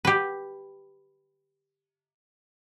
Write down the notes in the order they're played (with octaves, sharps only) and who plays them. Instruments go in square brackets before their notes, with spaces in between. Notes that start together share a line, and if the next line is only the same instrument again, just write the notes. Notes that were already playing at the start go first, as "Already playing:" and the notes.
[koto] G4 B4